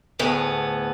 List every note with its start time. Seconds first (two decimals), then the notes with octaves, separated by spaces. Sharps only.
0.19 D2 A2 B3 G#4